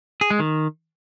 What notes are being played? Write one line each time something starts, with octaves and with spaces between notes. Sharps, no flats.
G#4
G#3
D#3